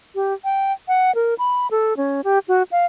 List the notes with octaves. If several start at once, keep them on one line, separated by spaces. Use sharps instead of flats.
G4
G5
F#5
A#4
B5
A4
C#4
G4
F#4
F5